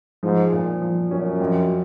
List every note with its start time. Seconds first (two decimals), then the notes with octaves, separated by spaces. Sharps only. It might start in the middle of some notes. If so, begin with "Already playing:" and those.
0.23 G#2 F3
0.52 A#2
0.82 F3
1.10 F#2 C#4
1.41 F2